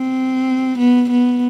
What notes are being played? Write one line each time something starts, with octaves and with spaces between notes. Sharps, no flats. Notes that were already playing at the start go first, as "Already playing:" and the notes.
Already playing: C4
B3
B3